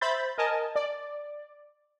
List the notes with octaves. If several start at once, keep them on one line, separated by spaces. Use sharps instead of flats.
C5 E5 B5 G6 A6
A#4 D#5 G#5 A5
D5